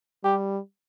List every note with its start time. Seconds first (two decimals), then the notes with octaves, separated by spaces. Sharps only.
0.24 G3 G4